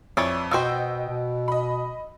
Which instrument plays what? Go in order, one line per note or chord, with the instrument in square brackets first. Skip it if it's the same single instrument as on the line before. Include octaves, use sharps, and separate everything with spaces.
[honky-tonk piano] F2 E6 [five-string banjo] E3 C#5 D5
[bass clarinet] B2 [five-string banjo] B3 F#4 C5 [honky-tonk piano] D#5 G5 E6
[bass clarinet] B2
[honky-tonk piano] D#5 B5